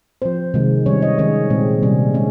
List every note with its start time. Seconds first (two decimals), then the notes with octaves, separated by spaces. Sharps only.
0.22 F3 C4 C5
0.54 C3 D#3 G#3
0.86 D#3 G3 C#4 C#5
1.02 D#5
1.18 D#3 G#3 C#4 C#5
1.50 A#2 G#3 C4
1.83 C3 G3 C#4
2.14 G#3 C#4